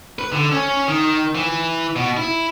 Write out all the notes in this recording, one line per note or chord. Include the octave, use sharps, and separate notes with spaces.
B4
D3
C#4
D#3
E3
B2
E4